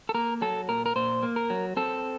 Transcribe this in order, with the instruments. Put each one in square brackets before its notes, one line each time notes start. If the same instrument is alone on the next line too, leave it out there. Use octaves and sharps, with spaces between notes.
[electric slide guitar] A4
A#3 A#4
F#3 A4
A#2 A#4
A#4
A#2 C5
A#3
A#4
F#3
C4 A4